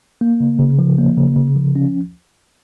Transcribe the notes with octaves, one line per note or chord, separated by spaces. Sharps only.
A#3
C#3
C#3
F3
A#3
C#3
C#3
F3
C#4